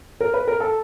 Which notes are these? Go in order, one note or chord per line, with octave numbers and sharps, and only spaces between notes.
A#4
B4
A#4
A4